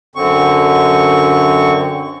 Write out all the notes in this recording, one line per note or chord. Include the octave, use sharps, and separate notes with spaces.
F#2 D3 C4 C#6